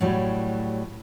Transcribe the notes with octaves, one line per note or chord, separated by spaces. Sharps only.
A2 F#3 G3